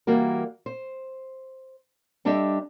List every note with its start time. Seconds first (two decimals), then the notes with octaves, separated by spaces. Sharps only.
0.07 E3 G3 A#3 F#4 A#4
0.66 C5
2.25 G3 D4 G4 A4 D#5 E5